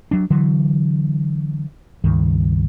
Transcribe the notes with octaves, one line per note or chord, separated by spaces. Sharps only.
F#3 D4
D3 E3 F#3
C#2 G2 D#3